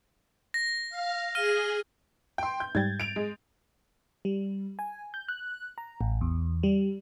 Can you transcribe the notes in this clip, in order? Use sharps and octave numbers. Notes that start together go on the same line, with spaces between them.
A#6
F5
G#4 F6 D#7
G5 C6
G6
G#2 G3 G5 G#6 A6
D7 F7
G#3
G3
G#5
G6
F#6
A#5
A1
E2
G3